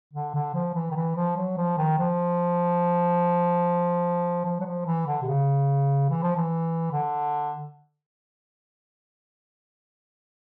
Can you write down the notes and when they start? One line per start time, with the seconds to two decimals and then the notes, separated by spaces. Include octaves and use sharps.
0.14 D3
0.34 D3
0.54 F3
0.75 E3
0.91 D#3
0.96 E3
1.16 F3
1.37 F#3
1.57 F3
1.77 D#3
1.98 F3
4.45 F3
4.60 F#3
4.65 F3
4.86 E3
5.07 D3
5.22 C3
5.27 C#3
6.09 E3
6.23 F3
6.36 E3
6.92 D3